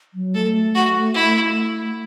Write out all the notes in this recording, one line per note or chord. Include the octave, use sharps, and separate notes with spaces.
F#3
A3 A4
F#4
E4